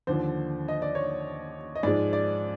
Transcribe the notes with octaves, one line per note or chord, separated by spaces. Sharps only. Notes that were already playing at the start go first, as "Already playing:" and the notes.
D#2 D3 F3 C5
D#5
D5
C#5
D#5
G#2 F3 G#3 D5
D5